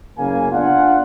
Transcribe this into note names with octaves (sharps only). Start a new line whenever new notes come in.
F#1 C#3 A#3 G#5
B3 D4 F4 F#5